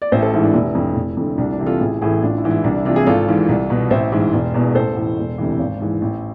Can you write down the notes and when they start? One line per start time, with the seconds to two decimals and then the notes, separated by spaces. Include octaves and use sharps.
0.02 D5
0.12 A1 C5 E5
0.22 A4 C5
0.33 G#2 E3 E4
0.43 D4
0.54 F1 E4
0.75 F2 D3
0.96 F1
1.17 F2 D3
1.38 C2 D4
1.52 D4
1.59 C3 E3
1.66 F4 A4
1.80 A1 E4 G#4
2.01 A2 E3 E4 G#4
2.22 A1 D4 F4
2.37 E4
2.44 G#2 E3
2.51 E4
2.64 C2 D4
2.75 E4
2.85 C3 E3 D4 F4
2.96 E4 G#4
3.06 G#1 F4 A4
3.28 G#2 E3
3.49 C2
3.70 B2
3.90 A1 C5 E5
4.12 G#2 E3
4.33 E1
4.54 E2 B2
4.75 A1 A4 C5
4.96 A2 E3
5.18 E1
5.38 D2 C3 E3
5.59 G#1
5.80 G#2 E3
6.02 A1